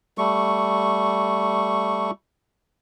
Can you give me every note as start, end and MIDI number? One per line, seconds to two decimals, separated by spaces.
0.18 2.11 55
0.18 2.11 57
0.18 2.11 85